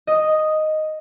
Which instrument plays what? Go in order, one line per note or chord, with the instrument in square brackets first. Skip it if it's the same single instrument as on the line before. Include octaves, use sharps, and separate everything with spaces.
[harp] D#5